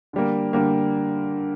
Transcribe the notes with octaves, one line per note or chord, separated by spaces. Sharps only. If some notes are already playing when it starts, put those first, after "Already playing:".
D3 G3 A#3
D3 G3 A#3